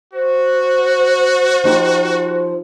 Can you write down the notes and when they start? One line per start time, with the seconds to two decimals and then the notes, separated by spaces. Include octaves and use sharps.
0.13 F#4 C5
1.64 F3 D#4 G4